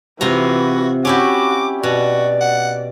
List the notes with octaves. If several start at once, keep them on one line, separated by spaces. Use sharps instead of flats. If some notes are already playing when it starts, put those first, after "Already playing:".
C3 E3 F4 F#4 A#5
C#4 E4 F#4 G4 D6
B2 F#4 D5
F#5